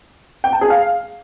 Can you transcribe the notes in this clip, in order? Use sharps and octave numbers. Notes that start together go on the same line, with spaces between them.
G5
A5
G#4
F5